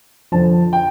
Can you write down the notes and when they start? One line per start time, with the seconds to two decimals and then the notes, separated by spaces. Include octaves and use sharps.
0.32 F2 D3 F3 A5
0.73 G5